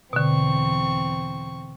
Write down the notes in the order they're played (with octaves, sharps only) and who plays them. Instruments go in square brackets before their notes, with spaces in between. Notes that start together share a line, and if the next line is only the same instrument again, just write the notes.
[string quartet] E2 C4 C#6 [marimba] B2 D3